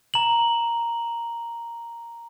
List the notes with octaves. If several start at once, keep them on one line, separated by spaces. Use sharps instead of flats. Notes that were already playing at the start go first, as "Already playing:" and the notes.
A#5 F#7